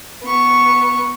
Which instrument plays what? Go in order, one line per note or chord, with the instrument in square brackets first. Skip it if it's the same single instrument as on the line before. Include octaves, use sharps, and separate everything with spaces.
[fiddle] B3 C#6